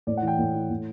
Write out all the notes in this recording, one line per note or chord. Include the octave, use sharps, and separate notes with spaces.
A2 D5
F#5
E3
G5
A2
E3
A2